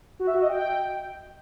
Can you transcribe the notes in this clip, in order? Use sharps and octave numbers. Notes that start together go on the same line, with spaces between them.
F#4
E5
F#4
D#5
G5